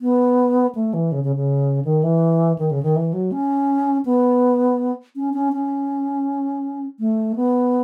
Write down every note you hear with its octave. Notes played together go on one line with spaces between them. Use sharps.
B3
A3
E3
C#3
C#3
C#3
D#3
E3
D#3
C#3
D#3
E3
F#3
C#4
B3
C#4
C#4
C#4
A3
B3